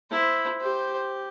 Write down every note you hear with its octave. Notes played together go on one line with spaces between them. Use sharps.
E4 C5
G4 C5